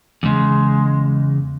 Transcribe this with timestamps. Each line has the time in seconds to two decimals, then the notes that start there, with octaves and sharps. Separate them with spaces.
0.23 E2 C#3 G#3